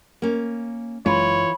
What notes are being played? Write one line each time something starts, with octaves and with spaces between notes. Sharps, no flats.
A#3 C#4
F#1 F#2 E3 G#3 F4 C#5 B5